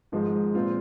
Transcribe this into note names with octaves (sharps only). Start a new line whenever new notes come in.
G#1 G#2 F3 G#3
A#2 F3 G#3 C4 F4